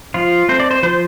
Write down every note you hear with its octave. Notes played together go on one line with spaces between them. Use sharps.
F3 F4
A3 C4 C5
D5
C5
F3 C5